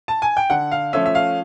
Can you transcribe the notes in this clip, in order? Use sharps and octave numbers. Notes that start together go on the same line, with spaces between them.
A5
G#5
G5
D3 F#5
F5
F3 A3 C#4 E5
E5
F5